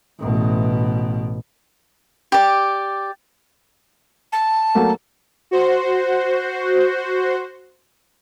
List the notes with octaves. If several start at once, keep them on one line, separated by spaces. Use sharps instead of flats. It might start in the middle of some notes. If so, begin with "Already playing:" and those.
A1 B2
G4 D5
A5
F#3 A3 A#3
F#4 C5